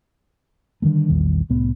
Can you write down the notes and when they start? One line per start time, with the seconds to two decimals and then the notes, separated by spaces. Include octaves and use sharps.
0.82 D3 D#3 G3 A3
1.08 A#1 E2 D#3 G3
1.49 C2 A2 B3